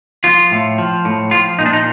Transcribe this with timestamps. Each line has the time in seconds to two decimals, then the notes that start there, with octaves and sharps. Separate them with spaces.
0.24 F3 F4
0.51 A2
0.78 F3
1.05 A2
1.31 F3 F4
1.59 A#2 D#4
1.66 D4
1.73 D#4